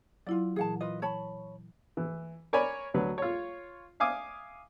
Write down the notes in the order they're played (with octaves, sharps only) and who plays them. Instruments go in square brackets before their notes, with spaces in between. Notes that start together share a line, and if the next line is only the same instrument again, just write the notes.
[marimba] F#3 E4 [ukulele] F4 D5
[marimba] A#2 E3 [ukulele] G#4 F#5 A5
[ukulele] F4 B4 D#5
C#5 A5 B5
[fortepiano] E3
A#4 C#5 D5 G#5 B5
D2 F#3 B4
F4 C#5
E5 F5 G#5 D6 D#6